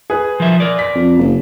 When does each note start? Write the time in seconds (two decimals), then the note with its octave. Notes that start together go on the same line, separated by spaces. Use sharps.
0.10 G#4 B4
0.40 F3 A#4 E5
0.60 A#4 D5
0.79 B6
0.95 F2
1.19 F#1